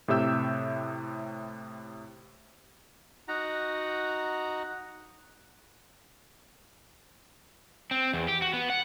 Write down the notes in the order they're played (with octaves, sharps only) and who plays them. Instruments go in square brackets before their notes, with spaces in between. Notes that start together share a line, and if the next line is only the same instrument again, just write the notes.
[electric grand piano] A2 C3 G4 E5 E6 G6
[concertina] D#4 F#4 F#5 A#5
[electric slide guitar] C4
E2
G4
F#4
B3
F#5